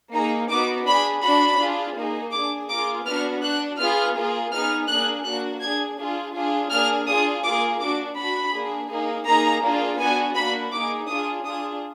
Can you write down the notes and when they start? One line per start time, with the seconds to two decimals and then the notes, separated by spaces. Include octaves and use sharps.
0.14 A#3 D#4 G#4 A#5
0.50 B3 D#4 F#4 D6
0.87 D4 G#4 B5
1.23 D4 F#4 B5
1.60 D4 F4 G#4
1.96 A#3 D#4 G#4
2.32 D4 G#4 D6
2.69 A#3 F4 G#4 D6
3.06 B3 D4 F#4 F6
3.42 D4 F#4 F#6
3.79 B3 F4 G#4 F6
4.15 A#3 F4 G#4
4.52 B3 D#4 G#4 F6
4.88 A#3 D4 G#4 F#6
5.25 A#3 D4 F#4 F#6
5.61 D4 G#4 G#6
5.97 D4 F4 G#4
6.34 D4 F4 G#4
6.70 A#3 D4 G#4 F6
7.07 D4 F4 G#4 D#6
7.44 A#3 F4 G#4 D6
7.80 D4 F#4 D6
8.16 D4 F#4 B5
8.53 A#3 D4 G#4
8.89 A#3 D#4 G#4
9.26 A#3 D#4 G#4 A#5
9.63 A#3 D4 F4 G#4
9.99 B3 D4 F#4 G#5
10.36 A#3 D4 F#4 B5
10.72 A#3 D#4 G#4 D6
11.08 D4 F4 G#4 D#6
11.45 D4 F4 G#4 D#6